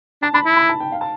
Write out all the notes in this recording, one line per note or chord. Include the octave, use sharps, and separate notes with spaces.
D4 A5
D4 B5
E4
B5
A5
G5
F5
A5